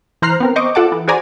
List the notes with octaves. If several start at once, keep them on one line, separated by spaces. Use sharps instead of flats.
E3 C5 A#5 F6 F#6 C7
B3 C4 A#4
C5 D#5 C#6 D6
F4 A4 F#5 A5 D6
E3
F#4 G#4 C5 D5 G#5 A#5